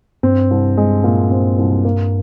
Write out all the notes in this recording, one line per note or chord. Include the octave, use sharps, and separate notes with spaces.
G2 C4
C2
G#3
A#2
C4
C2
A#3